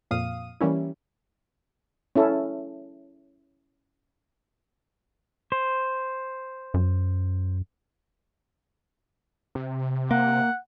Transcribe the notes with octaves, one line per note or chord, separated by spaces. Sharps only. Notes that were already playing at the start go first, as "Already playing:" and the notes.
F2 A#2 F5 D#6 D#7
E3 G3 A#3 C#4 E4
C#4 E4 A4
C5
F#2
C3
A#3 F#5